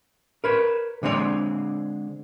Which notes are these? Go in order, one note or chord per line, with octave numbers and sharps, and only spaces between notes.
A#4 B4 C#5
D3 G#3 C4 C#4 C#5 D5